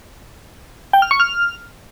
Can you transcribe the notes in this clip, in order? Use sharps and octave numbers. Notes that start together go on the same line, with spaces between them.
G5
F6
C#6
F6